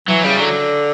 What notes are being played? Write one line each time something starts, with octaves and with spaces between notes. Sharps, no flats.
E3 F#3
C#3 G3
D3 F#3